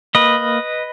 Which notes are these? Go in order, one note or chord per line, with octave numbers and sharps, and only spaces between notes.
A#3 B4 D#5